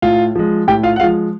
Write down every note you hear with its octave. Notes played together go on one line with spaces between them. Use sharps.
A2 F4 F5
F3 G#3
A2 G4 G5
F4 F5
F#5
F3 G#3 F4 F5